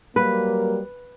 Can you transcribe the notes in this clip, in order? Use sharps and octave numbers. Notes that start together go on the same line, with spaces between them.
F#3 G3 A#3 B4